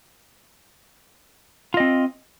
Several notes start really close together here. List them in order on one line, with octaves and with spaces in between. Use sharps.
F4 D#5 C4